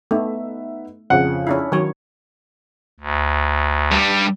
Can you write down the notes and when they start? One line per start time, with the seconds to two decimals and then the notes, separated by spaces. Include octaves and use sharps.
0.11 A3 B3 D#4 E5
1.10 F2 C#3 C4 F#5
1.47 C#4 D4 E4
1.72 D#3 F#3 C#5 G#6
3.00 D2
3.92 G2 G3